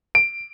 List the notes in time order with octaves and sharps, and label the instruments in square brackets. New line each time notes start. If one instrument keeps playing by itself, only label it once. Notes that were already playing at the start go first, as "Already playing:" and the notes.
[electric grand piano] D7